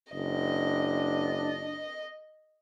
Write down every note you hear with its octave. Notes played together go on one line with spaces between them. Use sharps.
F#1 D4 D#5